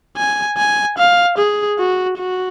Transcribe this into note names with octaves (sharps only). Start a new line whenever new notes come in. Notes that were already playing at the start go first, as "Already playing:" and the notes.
G#5
G#5
F5
G#4
F#4
F#4